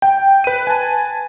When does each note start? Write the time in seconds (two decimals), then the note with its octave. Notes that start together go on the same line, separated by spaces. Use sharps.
0.02 G5
0.44 B4 D#7
0.67 G#5 A5